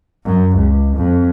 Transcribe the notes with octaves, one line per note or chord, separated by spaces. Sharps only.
F#2
C#2
F2